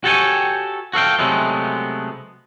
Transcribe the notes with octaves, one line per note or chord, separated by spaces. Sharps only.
F#4 G4 A4 C#5 G5 G#5
F#4 A4 F5 G5
C3 F#3 G#3 A3 B3